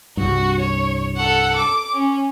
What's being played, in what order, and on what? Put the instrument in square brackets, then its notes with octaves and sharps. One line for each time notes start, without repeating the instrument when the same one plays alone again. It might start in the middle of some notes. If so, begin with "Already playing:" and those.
[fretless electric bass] C2 G2 [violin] F#4
[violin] C#5
A4 F#5
D6
C#4